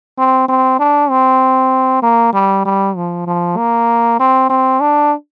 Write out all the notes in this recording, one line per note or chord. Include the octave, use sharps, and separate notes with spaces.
C4
C4
D4
C4
A#3
G3
G3
F3
F3
A#3
C4
C4
D4